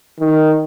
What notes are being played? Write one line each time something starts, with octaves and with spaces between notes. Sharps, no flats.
D#3